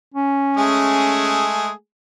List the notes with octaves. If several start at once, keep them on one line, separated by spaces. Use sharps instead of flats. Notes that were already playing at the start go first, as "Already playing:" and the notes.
C#4
G#3 A3 G#4